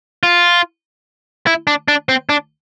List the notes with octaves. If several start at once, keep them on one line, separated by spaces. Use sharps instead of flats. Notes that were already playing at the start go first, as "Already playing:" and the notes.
F4
E4
D4
D4
C4
D4